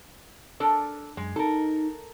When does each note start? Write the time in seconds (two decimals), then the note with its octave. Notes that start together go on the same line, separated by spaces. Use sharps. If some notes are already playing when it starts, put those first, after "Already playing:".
0.60 D4 A4 A#4
1.17 F#2 G#3
1.36 D#4 A4 A#4